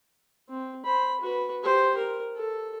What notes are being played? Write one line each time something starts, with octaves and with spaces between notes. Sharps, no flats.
C4
C5 B5
F#4 B4
G4 C5
A#4
A4